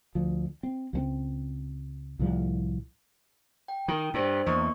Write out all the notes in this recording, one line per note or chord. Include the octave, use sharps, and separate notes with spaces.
D2 F3
C4
C#2 G#3 C4
C2 A2 F3 G3
G5
D#3
G2 D4 A4 C5
E2 A#3 D#5 C#6